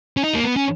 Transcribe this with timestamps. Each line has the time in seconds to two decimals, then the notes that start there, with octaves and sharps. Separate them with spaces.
0.17 C#4
0.24 D#4
0.35 A#3
0.44 B3
0.56 C#4